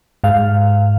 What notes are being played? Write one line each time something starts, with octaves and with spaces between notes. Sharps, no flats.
G#2 F5